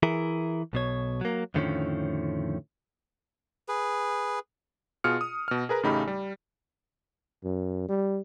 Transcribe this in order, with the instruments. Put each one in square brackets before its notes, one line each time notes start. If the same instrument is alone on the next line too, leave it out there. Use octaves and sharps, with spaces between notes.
[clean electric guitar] E3 E4 G#4 A#4
B1 B2 C#5
F#3 A#3
F2 A2 D3 D#3 F3 C#4
[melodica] G#4 B4
[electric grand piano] B2 F4 G#4 F6 C#7
D#6
B2 F6
G#4 A#4 B4 A#5
A1 C#3 A3 D#4 G4 B5
G3
[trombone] F#2
G3